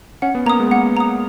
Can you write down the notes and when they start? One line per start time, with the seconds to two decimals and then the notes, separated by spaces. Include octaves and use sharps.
0.22 C#4 F#5
0.35 B3
0.46 A#3 A#5 D#6
0.60 G#3
0.67 B3
0.71 A#3 F#5
0.97 A#5 D#6